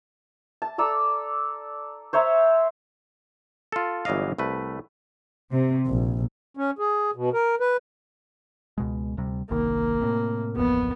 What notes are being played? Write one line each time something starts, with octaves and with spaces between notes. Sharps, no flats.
A5
A4 D5 A#5 E6
C5 C#5 E5 A#5
F4 A4
G1 E3 F#3 D5 D#5 F5
C2 A3 B4
C3
A#1
C#4
G#4
B2
A#4
B4
C#2 B2 G#3
D2 C3 G3
G1 C2 D#3 A#3
A2 C3
D1 A1 F2 B3